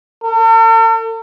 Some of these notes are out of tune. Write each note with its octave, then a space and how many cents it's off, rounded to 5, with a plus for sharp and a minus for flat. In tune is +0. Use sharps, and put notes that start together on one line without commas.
A4 +45